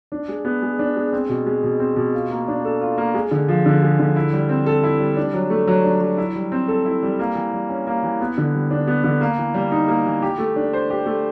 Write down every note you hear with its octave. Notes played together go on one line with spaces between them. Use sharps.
D4
G#3
B3
G#3
D4
G#3
C4
B2
G#3
B2
C4
B2
F4
A#3
D4
A4
F4
A#3
G#3
D3
F3
D3
G#3
D3
E4
G3
C4
A4
E4
G3
D4
F#3
A3
F#3
D4
F#3
E4
G3
C4
A4
E4
G3
A#3
E3
G3
C#4
A#3
E3
B3
D3
G3
D4
B3
D3
A#3
E3
G3
D#4
A#3
E3
G4
A3
D4
C5
G4
A3